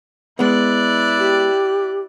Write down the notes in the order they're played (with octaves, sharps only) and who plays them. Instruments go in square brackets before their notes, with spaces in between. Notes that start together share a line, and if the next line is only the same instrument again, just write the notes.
[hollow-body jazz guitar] G#3 B3 [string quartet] E4 D5 F#6
[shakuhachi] G4